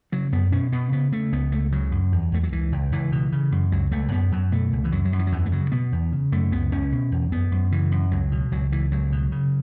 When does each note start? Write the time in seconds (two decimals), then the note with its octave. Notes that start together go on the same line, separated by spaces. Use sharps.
0.12 C#3 F#3
0.32 F#2 B3
0.52 B2 C#4
0.72 B2 B3
0.92 C#3 B3
1.12 C#3 A3
1.32 C#2 B3
1.52 C#2 A3
1.72 C#3 F#3
1.92 F#2
2.12 E2
2.32 E2 A3
2.43 F#3
2.52 C#2 E3
2.72 C#2
2.92 C#2 E3
3.12 B2
3.32 C#3
3.52 F#2
3.72 C#2 F#3
3.91 C#2 A3
4.12 F#2 B3
4.32 F#2 F#3
4.52 B2 A3
4.73 C#2
4.84 E3
4.92 F#2 F#3
5.05 F#3
5.12 F#2
5.19 E3
5.27 F#3
5.32 E2 E3
5.46 A3
5.52 C#3 F#3
5.72 B2 B3
5.92 E2
6.12 C#3
6.32 F#2 A3
6.52 C#2 B3
6.72 C#2 C#4
6.92 B2
7.12 E2
7.32 F#2 B3
7.52 F#2
7.72 C#3 E3
7.92 F#2
8.11 C#2 F#3
8.32 B2
8.52 C#2 F#3
8.72 C#2 E3
8.92 C#2 F#3
9.12 B2
9.32 C#3